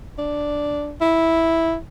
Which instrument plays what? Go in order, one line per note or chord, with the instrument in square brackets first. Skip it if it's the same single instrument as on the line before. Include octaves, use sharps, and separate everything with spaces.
[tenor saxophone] D4
E4